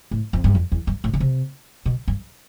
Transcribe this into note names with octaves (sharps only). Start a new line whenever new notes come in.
A2
F2
G2
F2
E2
G2
A2
D3
C3
B2
G2